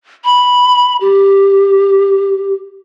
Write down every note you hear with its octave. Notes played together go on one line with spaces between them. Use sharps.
B5
G4